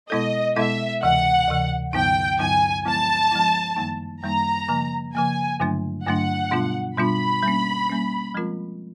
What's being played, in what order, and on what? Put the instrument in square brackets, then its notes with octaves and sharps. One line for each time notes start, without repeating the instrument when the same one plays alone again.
[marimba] B2 G#3 B3 E4 A4 [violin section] D#5
[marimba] B2 G#3 B3 E4 A4 [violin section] E5
[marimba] D2 C3 E3 [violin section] F#5
[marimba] D2 C3 E3
[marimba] G2 D3 F#3 B3 D#4 [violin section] G5
[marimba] G2 D3 F#3 B3 D#4 [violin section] G#5
[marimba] F3 G#3 B3 E4 [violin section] A5
[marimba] F3 G#3 B3 E4
F#2 D#3 G3 A#3 D#4
[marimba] F#2 D#3 G3 A#3 D#4 [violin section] A#5
[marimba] C#3 F3 A#3
[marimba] C#3 F3 A#3 [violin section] G#5
[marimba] G2 D3 F#3 A3 D4
[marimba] G2 D3 F#3 A3 D4 [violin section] F#5
[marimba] B2 G3 B3 D4 F4
[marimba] B2 G3 B3 D4 F4 [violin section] B5
[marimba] G3 A#3 C#4
G3 A#3 C#4
F3 G#3 C4 F4 A#4